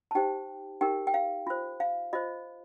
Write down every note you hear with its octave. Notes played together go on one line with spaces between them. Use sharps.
A5
D#4 G4 C5 G5
D#4 G4 A#4 G5
G5
F5
F4 C5
F5
F4 C5 D#5